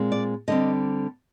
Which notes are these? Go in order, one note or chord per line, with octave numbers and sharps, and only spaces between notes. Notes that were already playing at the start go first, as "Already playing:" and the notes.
Already playing: A#2 G#3 C4
D5
D3 G3 C4 D#5